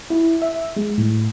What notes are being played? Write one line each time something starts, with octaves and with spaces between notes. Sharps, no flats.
E4
E5
G#3
A2